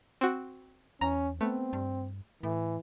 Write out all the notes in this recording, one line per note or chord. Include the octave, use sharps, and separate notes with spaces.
C4 F#4
E2 C#4 A#5
A3 B3 C4
G2
A2 E3